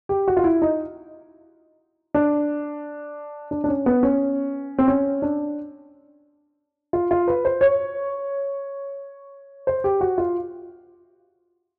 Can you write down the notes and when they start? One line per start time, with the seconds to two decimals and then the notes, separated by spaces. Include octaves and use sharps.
0.09 G4
0.28 F#4
0.37 F4
0.44 E4
0.62 D#4
2.14 D4
3.51 D4
3.64 D4
3.68 C#4
3.86 B3
4.03 C#4
4.78 C4
4.88 C#4
5.22 D4
6.93 F4
7.11 F4
7.28 B4
7.45 C5
7.61 C#5
9.67 C5
9.84 G4
10.01 F#4
10.18 F4